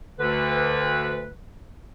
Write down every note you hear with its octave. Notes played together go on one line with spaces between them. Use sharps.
D2 D3 B4